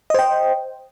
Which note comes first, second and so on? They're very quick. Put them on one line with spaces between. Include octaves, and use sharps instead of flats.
D#5 C5 G5